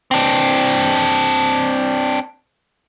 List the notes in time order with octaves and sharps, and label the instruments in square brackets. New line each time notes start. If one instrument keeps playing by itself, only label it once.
[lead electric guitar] C4 D4